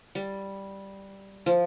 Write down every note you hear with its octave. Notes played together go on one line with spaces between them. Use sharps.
G3
F3